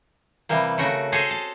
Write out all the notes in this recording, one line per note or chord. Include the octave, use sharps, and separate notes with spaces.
C3 E3 G3 A#3
C#3 A3 F#4 A#4
G#4 A4 C5 C#5 D#5 G#5
A5